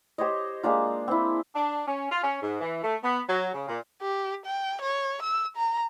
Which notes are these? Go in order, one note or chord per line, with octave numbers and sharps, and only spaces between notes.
G4 C5 C#5 D#5
G#3 A#3 D4 F4
C4 E4
D4
C#4
F4
C#4
G#2
E3
A3
B3
F#3
C#3
A#2
G4
G5
C#5
E6
A#5